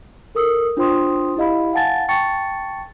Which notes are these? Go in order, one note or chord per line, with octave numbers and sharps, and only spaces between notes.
A4 A#4 D#6 E6
D4 F4 C5 G5 C6 D#6
E4 G4 D#5 F5 B5
F5 F#5 G#5 A5 A6
G5 A5 C#6 A6 C#7